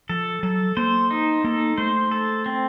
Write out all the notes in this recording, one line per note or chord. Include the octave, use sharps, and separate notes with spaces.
F3 A4
F#3 A4
A#3 C5
D#4
A#3 A4
A3 C5
A4
C4